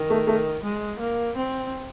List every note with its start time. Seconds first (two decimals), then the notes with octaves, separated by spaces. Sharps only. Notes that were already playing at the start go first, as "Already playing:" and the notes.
Already playing: D#3
0.10 A3
0.27 A3
0.63 G#3
1.00 A#3
1.36 C4